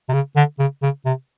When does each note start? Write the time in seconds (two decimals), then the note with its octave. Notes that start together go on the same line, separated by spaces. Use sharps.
0.09 C3
0.13 C#3
0.36 D3
0.59 C#3
0.83 C#3
1.06 C3